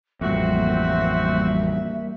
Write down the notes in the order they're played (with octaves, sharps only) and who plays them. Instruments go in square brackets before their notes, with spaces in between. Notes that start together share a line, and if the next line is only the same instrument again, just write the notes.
[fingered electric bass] A1 F2 [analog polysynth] G3 A#3 [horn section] C4 F#4 [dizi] E5